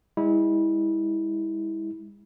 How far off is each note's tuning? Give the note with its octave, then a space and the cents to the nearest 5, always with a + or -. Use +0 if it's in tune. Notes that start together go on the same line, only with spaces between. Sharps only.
G#3 -35 E4 -25